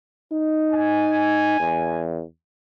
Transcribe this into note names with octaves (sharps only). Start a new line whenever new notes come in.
D#4
G#5
E2